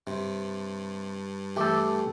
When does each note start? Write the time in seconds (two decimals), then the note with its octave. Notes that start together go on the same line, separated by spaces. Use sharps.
0.07 G2 C3
1.56 E3 A3 G4 A4